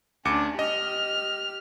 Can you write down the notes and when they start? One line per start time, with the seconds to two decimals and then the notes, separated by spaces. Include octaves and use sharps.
0.25 D2 C#4 D4 D6 C#7
0.59 G4 D#5 F6